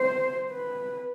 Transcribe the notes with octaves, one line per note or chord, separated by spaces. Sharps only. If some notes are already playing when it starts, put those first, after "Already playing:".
Already playing: C5
B4